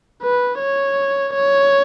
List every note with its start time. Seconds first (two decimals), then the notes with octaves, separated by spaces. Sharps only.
0.23 B4
0.60 C#5
1.34 C#5